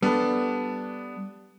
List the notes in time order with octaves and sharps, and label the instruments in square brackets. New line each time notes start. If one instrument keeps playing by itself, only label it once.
[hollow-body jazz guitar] G3 A4 [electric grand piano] B3 D4